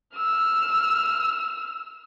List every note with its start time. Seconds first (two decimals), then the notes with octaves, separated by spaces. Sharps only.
0.16 E6 F6